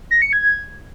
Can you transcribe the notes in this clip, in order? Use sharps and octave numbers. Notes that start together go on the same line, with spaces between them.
A#6
C#7
G#6